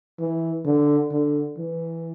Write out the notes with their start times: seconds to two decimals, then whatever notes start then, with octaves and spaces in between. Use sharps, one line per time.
0.19 E3
0.65 D3
1.11 D3
1.58 E3